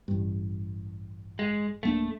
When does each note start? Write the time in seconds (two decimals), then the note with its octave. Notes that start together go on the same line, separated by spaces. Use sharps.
0.08 A1 G2
1.39 G#3
1.83 D1 A3 A#3 D4